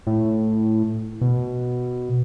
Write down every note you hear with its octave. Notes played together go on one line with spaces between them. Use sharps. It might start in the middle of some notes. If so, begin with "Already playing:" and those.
A2
B2